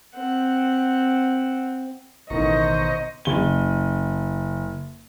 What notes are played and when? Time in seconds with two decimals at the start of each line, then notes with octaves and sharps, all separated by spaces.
0.16 C4 F#5
2.30 A1 B2 D#3 C5 D#5 A#5 C#6
3.25 F#1 G7